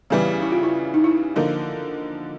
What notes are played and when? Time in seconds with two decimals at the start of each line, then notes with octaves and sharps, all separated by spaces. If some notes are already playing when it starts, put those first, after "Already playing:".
0.10 C#3 E3 G3 B3
0.42 E4
0.52 F4
0.63 E4
0.94 D#4
1.04 E4
1.36 D3 F3 A#3 D#4